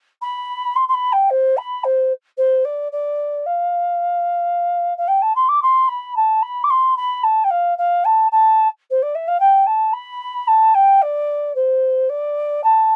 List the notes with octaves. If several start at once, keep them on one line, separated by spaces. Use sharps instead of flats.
B5
C6
C6
B5
G5
C5
B5
C5
C5
D5
D5
F5
F5
G5
A5
C6
D6
C6
B5
A5
B5
D6
C6
B5
A5
G5
F5
F5
A5
A5
C5
D5
E5
F5
G5
A5
B5
A5
G5
D5
C5
D5
A5